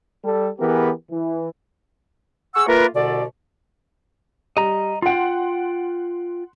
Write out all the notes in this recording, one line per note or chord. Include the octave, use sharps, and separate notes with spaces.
G3 A4
E3 B3 G4 G#4 A#4
E3
G#4 F#5 C#6 E6
A3 A#3 F4 A#4 B4
C2 B2 D3 D5
G3 D#5 A#5
F4 F#5 G5 C6